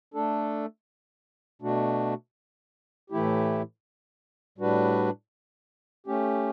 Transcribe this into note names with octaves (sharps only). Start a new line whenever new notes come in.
A3 D4 A4
B2 A3 D4 F#4
A2 E3 A3 E4 G4
A2 G3 D4 F#4 B4
A3 C#4 G4